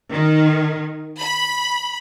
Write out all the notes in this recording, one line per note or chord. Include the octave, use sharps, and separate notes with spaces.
D#3
B5